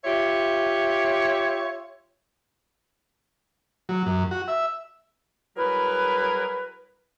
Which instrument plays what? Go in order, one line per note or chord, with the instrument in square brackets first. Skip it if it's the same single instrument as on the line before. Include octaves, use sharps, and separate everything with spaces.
[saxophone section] F4 G4 C#5 E5
[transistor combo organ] F#3
F#2
F#4
E5
[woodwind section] F#3 G3 E4 G#4 A#4 B4